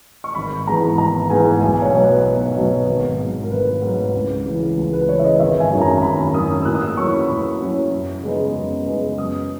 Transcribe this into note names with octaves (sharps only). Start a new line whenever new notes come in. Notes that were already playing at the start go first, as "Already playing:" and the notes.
C#6
G#1 B5
G#2 E3 G#3 B3 A#5
G#1 A#5
G#2 E3 G#3 B3 G#5
B1 G#5
C#5
B2 F#3 B3 D#4
B4
B1 B4
B2 F#3 B3 D#4
G#1
G#2 F#3
A#4
G#1 B4
G#2 F#3
C#2
C#3 E3
C#2
B4
C#3 E3 C#5
E5
D#5
G#1 E5
G#5
F#2 D#3 F#3
A#5
A#5
G#1 B5
F#2 D#3 F#3 D#6
E6
A#2 F#6
D#6
E6
F#3 C#4 E4 C#6
B5
A#2 B5
F#3 C#4 E4
F#2
C#3 G#3 B3 D#4
F#2
C#3 G#3 B3 D#4
F#2 D#6